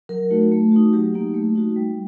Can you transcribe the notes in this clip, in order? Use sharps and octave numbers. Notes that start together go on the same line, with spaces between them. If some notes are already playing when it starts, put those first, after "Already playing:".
F#3 A#4
A3 D#4 F#4
A3
D#4 F#4
F#3 G4
A#3 D#4
A3
D#4 F#4
G3